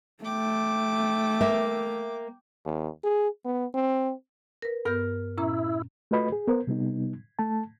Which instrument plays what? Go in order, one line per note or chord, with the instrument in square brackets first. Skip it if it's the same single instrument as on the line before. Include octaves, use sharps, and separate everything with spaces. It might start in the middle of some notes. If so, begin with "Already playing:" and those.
[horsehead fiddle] A3 [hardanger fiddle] G5 D6
[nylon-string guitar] A#3 E5
[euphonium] D#2
G#4
B3
C4
[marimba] A#4 B4
[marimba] G2 B3 G6 [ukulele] A#4
[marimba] A#2 C#4 A#5 [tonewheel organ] E4
[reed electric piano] A3 F4 F#4 B4 D#5 B5
G#4
B3 A#4 C5
C3 G3 B3 D#4
A3 A5